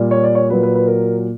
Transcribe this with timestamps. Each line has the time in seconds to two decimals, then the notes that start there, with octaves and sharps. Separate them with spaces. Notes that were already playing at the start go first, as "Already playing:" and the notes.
Already playing: A#2 G3
0.11 C#5
0.24 D5
0.35 C#5
0.50 A#2 F#3 B4
0.63 B4
0.75 B4
0.87 A#4